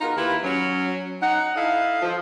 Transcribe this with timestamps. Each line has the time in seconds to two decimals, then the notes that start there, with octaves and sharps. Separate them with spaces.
0.01 B3 D#4 F4 F#4 G#4 A#4
0.17 D#2 E4 F4 G4 B4
0.44 F#3 C#4
1.22 D#4 F#5
1.56 E4 A4 D#5 F5
2.02 F3